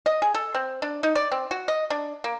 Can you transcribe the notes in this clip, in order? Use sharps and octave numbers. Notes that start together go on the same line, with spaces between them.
D#5
G#4
A4
C4
D4
D#4
D5
C4
F#4
D#5
D4
A#3